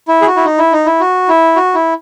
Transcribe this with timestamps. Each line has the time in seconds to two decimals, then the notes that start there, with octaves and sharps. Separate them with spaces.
0.08 E4
0.22 G#4
0.27 F#4
0.36 E4
0.45 D#4
0.58 E4
0.73 D#4
0.86 E4
1.00 F#4
1.29 E4
1.56 F#4
1.74 E4